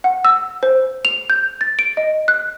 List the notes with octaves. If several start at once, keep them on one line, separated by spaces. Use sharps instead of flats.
F#5
E6
C5
F7
G6
A6
D7
D#5
F#6